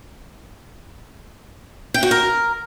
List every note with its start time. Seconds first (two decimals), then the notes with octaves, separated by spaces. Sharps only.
1.94 G5
2.03 F#4
2.11 A#4